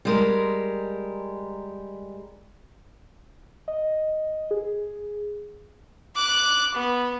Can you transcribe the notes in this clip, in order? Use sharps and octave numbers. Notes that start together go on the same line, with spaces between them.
G3 G#3 A#4
D#5
G#4
D6 F#6
B3